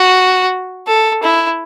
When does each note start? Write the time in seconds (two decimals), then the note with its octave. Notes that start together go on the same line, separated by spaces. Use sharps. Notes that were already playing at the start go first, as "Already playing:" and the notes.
Already playing: F#4
0.88 A4
1.23 E4